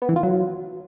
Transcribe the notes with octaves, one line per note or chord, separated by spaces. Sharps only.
B3
E3
F4
F#3